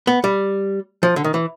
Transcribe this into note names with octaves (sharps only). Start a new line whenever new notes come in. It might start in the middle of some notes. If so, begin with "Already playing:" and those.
B3
G3
F3
D3
D#3
E3